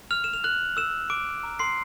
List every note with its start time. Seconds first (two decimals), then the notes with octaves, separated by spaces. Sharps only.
0.11 F6 F7
0.24 E7
0.33 F7
0.44 F#6 F#7
0.77 E6 E7
1.10 D6 D7
1.43 A#5 D6 F6
1.59 C6 C7